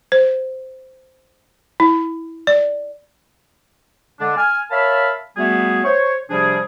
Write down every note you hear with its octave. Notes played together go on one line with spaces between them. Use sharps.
C5
E4
D5
D3 G#3 D4
G#5 F6
A#4 C#5 E5 F5 A5 B5
G3 A3 B3 F#4 G#4
C5 C#5
C3 F3 G3 D4 G#4